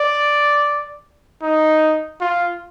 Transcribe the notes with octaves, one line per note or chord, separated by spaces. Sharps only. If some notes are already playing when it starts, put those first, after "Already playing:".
Already playing: D5
D#4
F4